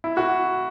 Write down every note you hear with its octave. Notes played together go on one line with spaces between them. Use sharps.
E4
F#4